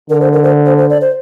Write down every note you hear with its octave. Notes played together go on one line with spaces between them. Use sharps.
D3 A#4
C5
A#4
C5
C5
C5
D5
C5